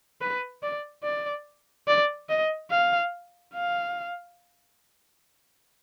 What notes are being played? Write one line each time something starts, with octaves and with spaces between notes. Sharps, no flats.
B4
D5
D5
D5
D#5
F5
F5